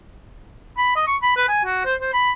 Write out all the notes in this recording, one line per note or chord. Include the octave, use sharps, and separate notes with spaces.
B5
D#5
C#6
B5
B4
G#5
F#4
C5
C5
B5